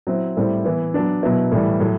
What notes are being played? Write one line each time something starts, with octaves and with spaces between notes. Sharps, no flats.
F#3 C4 E4
A2 G3 C4 E4
E3 B3 E4
F#3 B3 D4
B2 F#3 B3 E4
A2 E3 G3
A2 F#3